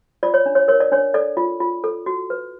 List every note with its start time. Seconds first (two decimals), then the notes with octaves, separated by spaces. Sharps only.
0.23 F4 D5
0.34 C#5
0.46 D4
0.55 C#5
0.68 A#4 C#5
0.80 D5
0.92 D4 C#5
1.14 A4 D5
1.37 F4
1.60 F4
1.84 A4
2.06 F#4
2.30 B4